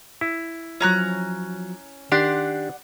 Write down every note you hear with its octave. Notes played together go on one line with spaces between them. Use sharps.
E4
F3 F#3 C#4 A#5 F#6
D#3 D4 G4 D5 F#5 C6